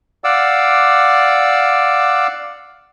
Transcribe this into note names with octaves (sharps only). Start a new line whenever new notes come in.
D5 F5 F#5 D6 E6